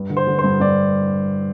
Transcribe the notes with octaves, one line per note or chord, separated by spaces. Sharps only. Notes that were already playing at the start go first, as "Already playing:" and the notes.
Already playing: G2
D3
C5
D3
C5
G2
G2 D5